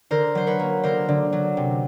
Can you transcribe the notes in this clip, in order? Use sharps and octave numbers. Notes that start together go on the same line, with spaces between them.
D3 A#4 C5
F#3 C5
B4 C#5
A#3
D3 A#4 C5
D3
F#3
C3